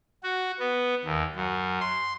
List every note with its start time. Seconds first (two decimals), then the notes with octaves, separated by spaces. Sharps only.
0.23 F#4
0.59 B3
1.05 D#2
1.35 F#2
1.80 C6